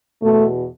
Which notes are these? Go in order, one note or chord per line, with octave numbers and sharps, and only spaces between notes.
E2 B2 A3